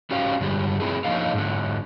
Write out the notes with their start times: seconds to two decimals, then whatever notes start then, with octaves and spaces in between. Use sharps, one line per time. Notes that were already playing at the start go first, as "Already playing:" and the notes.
0.11 A3 C#4 F#4 G4 C5 F5
0.41 G2 D3 G3 G#3
0.80 A3 C4 E4 G#4
1.05 F3 A#3 D4 D#4 A4 F5
1.34 G#2 D3